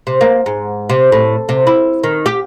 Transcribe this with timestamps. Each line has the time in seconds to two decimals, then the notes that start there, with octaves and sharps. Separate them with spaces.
0.07 C3
0.21 A#3
0.46 G#2
0.90 C3
1.12 A2
1.49 C3
1.67 E4
2.03 D#3
2.26 G4